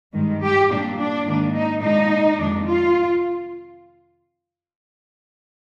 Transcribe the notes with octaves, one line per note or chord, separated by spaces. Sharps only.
G2 D#3 G#3
G4
A#2 G3 A#3 D4
D4
G#2 D#3 A#3 D4
D#4
A#2 G#3 D4 D#4
F2 C3 D#3 G#3 D4
F4